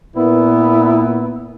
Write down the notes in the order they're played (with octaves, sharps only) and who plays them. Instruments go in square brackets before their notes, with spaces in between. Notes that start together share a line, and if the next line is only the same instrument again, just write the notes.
[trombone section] A#2 B3 [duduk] E4